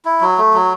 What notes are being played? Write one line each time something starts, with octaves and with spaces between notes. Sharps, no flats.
E4
F#3
A3
F#3